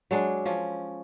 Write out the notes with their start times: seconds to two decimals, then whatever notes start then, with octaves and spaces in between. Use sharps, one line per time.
0.11 F#3 G#3 D4
0.46 F3 C#4